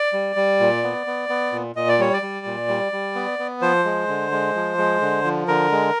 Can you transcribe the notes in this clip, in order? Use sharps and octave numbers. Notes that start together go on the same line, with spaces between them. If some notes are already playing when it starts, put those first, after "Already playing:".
Already playing: D5
G3
G3
A#2
B3
B3
B3
A#2
A#2 D#5
D5
G3 C#5
D5
G3
A#2
G3
G3
B3
B3
F3 C5
G#3
D3
G#3
F3
G#3
D3
F3
D3 A#4
G#3